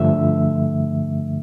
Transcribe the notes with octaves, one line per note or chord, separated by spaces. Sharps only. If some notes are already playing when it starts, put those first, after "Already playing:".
Already playing: G2 D3 F3 A3 E5